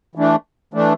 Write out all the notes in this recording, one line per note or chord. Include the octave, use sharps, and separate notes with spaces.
E3 A3 D4
E3 A3 D4